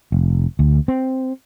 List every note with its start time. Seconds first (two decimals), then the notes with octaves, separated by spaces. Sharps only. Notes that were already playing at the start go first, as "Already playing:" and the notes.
0.12 F1
0.59 D2
0.88 C4